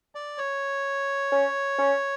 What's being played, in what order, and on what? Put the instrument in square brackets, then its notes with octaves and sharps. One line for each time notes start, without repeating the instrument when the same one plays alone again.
[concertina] D5
C#5
[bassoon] C#4
C#4